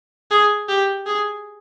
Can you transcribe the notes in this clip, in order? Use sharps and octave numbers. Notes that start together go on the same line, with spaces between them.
G#4
G4
G#4